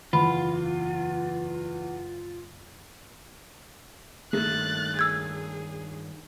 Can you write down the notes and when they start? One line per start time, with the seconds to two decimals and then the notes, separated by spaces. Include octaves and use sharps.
0.13 F#1 E2 F4 B5
4.33 G2 D#3 A3 A#3 F#6 A6
4.99 G#4 E6 G#6